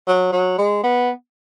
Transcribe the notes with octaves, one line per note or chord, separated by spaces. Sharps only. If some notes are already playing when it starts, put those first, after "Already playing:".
F#3
F#3
G#3
B3